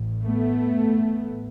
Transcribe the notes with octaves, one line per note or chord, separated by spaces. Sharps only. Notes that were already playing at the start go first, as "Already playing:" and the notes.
Already playing: A1 A2
A3 B3